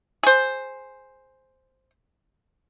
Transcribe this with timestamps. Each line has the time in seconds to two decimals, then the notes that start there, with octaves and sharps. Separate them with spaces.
0.23 G#4 C5